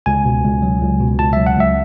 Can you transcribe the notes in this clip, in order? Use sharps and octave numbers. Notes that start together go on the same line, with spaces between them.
C#2 G#5
B2
C#2
F#3
C#2
B2
C#2 A5
F#3 E5
F#5
C#2 E5